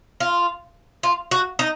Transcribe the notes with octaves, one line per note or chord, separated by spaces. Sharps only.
F4
F4
F#4
D#4